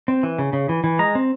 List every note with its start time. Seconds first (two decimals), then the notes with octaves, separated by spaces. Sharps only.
0.08 C4
0.23 E3
0.39 C#3
0.53 C#3
0.69 E3
0.84 E3
0.99 G#3 A#5
1.15 C4